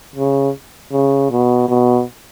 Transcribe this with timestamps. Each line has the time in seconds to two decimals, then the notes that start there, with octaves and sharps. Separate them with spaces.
0.16 C#3
0.92 C#3
1.30 B2
1.68 B2